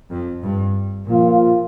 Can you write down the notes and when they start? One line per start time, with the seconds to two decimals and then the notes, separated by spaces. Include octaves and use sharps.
0.10 F2
0.42 G2
1.07 A#2 F3 A#3 F4